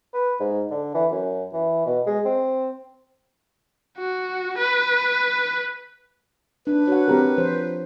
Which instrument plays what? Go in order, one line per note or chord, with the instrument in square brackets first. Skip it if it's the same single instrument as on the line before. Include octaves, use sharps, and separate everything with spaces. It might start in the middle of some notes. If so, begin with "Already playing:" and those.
[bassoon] B4
G#2
D3
E3
F#2
E3
B2
G#3
C4
[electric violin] F#4
B4
[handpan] D4 [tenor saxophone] B4
[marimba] F#4 [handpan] C#5 F#5
[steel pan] C4 G4 A#4
[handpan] F3 C5